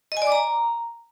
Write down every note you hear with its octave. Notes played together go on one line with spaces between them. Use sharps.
D#5
G#5
D5
D6
A#5